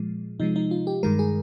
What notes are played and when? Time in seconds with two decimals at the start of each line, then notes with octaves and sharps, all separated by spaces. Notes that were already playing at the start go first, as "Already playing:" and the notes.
Already playing: A#2 F3 G#3
0.40 C3 F3 G#3 D#4
0.56 D#4
0.71 F4
0.87 G4
1.03 G2 D#3 G#3 A#4
1.19 G#4